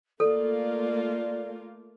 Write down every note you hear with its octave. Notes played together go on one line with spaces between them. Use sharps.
A3 A#3 F4 A4 D5